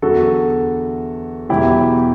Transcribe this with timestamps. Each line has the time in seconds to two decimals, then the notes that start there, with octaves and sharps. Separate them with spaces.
0.02 E2 D3 F#3 F#4 A4
1.49 E2 B2 F#3 E4 G4